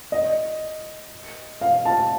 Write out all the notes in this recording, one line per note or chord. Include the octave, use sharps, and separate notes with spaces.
D#5
F5
A5